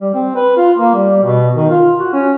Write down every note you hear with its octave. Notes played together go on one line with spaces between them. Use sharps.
G3
C4
B4
F4
A#3
G3
B2
D#3
F4
F#4
C#4